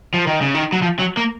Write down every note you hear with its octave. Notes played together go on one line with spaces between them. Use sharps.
F3
D#3
C#3
D#3
F#3
F3
F#3
A#3